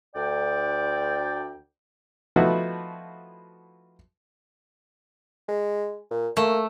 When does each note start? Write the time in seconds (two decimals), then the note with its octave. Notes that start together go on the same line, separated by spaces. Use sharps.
0.15 D2 D5 G5
2.36 F3 A3 B3 D#4 E4 F#4
5.48 G#3
6.11 A#2
6.37 A3 A#3